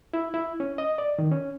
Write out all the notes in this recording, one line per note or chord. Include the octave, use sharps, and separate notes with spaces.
E4
E4
C#4
D#5
D5
D#3
C#4